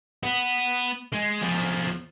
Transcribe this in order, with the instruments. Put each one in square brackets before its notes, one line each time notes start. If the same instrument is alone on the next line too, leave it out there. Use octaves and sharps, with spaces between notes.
[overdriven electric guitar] B3
G#3
E2 F3